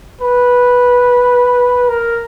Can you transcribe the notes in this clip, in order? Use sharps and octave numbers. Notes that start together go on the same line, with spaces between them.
B4
A#4